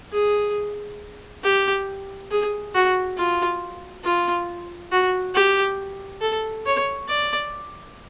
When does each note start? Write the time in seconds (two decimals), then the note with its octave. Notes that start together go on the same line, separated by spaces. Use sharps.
0.13 G#4
1.44 G4
2.31 G#4
2.75 F#4
3.17 F4
4.04 F4
4.92 F#4
5.35 G4
6.21 A4
6.66 C#5
7.09 D5